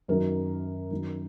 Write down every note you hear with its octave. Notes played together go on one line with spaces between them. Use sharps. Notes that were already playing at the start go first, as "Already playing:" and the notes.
F#2 D#3 F#3 A#4
F#2 D#3 F#3